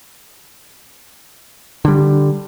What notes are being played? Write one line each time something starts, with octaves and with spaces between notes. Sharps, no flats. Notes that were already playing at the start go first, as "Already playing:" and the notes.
D3 G3